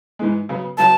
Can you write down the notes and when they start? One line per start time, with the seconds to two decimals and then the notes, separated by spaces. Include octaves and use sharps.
0.19 G#2 E3 G#3
0.49 C#3 F#3 B3
0.77 C#3 F#3 B3 A5